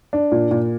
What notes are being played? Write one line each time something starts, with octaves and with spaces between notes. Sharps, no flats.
D4
A#2
A#2